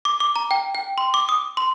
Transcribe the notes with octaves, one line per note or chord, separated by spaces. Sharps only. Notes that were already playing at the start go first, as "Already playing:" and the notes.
D6
D6
A#5
G5
G5
C6
D6
D#6
C6